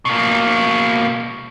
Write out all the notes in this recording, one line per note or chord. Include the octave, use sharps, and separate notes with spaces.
B2 A#3